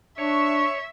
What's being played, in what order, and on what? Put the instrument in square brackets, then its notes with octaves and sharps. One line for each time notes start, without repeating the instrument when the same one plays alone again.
[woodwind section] D4 [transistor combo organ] C#5 [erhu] E5 [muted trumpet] C#6